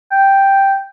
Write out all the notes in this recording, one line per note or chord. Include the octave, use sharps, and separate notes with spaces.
G5